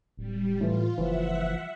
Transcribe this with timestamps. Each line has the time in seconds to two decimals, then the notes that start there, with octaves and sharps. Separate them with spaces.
0.17 D1 G3
0.60 A2 E3 F4
0.98 F#1 E3 F3 E5 F#5